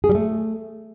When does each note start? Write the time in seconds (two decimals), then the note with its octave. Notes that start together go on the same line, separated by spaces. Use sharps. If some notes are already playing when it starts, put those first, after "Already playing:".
0.04 G#4
0.09 G3
0.15 A3